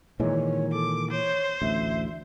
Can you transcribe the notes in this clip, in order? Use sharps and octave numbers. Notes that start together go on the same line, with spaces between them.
A#2 D#3 E3 G#3 C#5
A4 D6
C5 C#5
A1 D2 E5